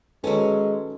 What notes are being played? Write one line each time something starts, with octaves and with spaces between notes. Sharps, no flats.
D#3 F#3 G#3 C#4 A4 B4